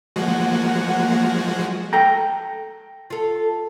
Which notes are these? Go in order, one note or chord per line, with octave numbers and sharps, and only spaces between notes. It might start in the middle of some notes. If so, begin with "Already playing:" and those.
F3 G#3 A#3 F#4 F#5
A4 G5 A#5
F4 A4